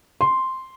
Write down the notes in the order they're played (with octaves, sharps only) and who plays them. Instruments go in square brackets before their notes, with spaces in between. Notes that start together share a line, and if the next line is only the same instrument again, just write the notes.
[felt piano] C6